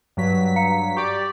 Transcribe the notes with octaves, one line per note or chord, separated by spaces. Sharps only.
G2 F#3 B6
F5 A#5 C#7
G4 D5 C#6